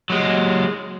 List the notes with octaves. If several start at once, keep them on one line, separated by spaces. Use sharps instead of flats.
F#3 G#3